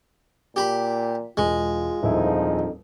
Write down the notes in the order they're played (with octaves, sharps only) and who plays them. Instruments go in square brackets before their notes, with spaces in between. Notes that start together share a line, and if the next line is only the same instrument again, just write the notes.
[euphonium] A#2 [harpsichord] G4 B5
[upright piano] E1 [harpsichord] G#3 [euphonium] F4
[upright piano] D#1 E4 [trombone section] F2 D3 F3 [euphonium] D#4